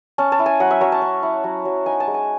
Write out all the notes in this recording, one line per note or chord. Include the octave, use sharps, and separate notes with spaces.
C#4 A5
A5
E4
G#5
F#3 F#5
E5
F#3 C#5
A5
C#4
E4
F#3
F#3
D#4 G#5
A5
G#3
G#5